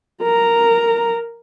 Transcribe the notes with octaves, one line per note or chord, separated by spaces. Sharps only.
A#4 A#5